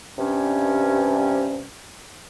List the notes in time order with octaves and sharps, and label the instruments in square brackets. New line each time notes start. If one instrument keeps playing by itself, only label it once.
[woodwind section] G2 C3 C#4